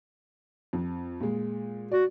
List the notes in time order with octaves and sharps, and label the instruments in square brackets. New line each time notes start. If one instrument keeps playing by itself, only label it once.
[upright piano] F2
A#2 G#3
[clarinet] F#4 [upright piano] D5